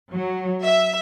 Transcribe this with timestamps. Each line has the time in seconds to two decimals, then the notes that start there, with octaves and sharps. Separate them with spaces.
0.12 F#3
0.62 E5